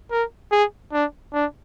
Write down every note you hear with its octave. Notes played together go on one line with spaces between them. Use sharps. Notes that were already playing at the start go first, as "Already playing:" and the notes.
A#4
G#4
D4
D4